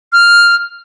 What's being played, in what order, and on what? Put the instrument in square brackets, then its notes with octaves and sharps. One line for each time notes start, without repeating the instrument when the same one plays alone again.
[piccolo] F6